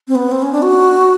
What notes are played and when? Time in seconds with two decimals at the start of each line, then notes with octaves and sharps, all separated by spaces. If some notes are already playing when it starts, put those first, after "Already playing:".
0.08 C4
0.15 B3
0.32 C4
0.42 C#4
0.52 D4
0.62 F#4